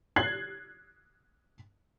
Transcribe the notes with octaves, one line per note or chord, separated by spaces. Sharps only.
F#6 G#6 A6 C7 F#7